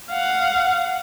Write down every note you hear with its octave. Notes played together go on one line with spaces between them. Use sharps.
F5 F#5